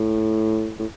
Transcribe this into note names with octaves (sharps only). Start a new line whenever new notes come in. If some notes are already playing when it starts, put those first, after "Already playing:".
Already playing: A2
A2